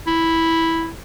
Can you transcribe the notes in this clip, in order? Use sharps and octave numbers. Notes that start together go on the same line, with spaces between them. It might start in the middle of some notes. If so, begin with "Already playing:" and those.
E4